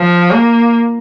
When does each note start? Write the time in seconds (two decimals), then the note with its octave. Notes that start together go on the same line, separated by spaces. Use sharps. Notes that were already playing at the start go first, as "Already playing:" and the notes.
Already playing: F3
0.31 A#3